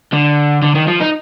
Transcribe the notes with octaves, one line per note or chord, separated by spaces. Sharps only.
D3
D3
D#3
F3
D#4